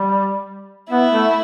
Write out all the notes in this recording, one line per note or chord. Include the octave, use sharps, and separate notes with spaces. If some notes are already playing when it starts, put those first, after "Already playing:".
Already playing: G3
B3 E4
A3